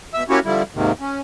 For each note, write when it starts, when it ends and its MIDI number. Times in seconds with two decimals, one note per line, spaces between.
0.14 0.24 47
0.14 0.24 76
0.14 0.24 88
0.29 0.40 58
0.29 0.40 61
0.29 0.40 64
0.29 0.40 66
0.29 0.40 67
0.29 0.40 73
0.45 0.63 50
0.45 0.63 53
0.45 0.63 55
0.45 0.63 64
0.74 0.92 39
0.74 0.92 44
0.74 0.92 48
0.74 0.92 51
1.00 1.21 61